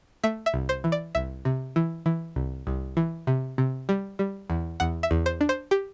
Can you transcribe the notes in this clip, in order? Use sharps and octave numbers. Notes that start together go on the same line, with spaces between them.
A3 E5
E5
C2
C5
E3
D5
C2 E5
C3
E3
E3
C2
C2
E3
C3
C3
G3
G3
E2
E2 F#5
E5
E2
C5
D4
C5
G4